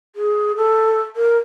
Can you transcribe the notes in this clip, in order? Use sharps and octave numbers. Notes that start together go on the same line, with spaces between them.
G#4
A4
A#4